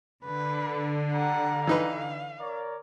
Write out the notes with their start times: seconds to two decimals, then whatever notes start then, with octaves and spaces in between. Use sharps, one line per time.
0.25 D3 B4
1.13 G3 F#5 A#5
1.67 E3 D#4 B4 F5
2.39 A#4 C#5 D5